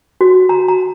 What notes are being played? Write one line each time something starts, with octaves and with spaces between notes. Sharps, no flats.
F#4
A#5
A#5